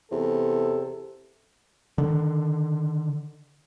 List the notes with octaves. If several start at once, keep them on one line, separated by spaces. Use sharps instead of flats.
E2 C3 A4
D3 D#3